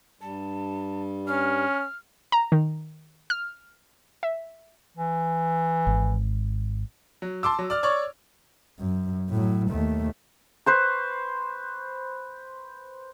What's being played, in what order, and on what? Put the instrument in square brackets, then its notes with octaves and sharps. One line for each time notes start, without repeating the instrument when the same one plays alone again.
[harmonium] G2 G3 [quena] A5
[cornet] C#4 [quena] F6
[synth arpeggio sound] A#5
D#3
F6
E5
[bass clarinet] E3
[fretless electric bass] G#1
[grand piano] F#3
A5 C6 D6 E6
F#3
D5 F6
C#5 D5 C#6
[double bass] F#2
A2 F#3
D#2 A3
[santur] B4 C5 C#6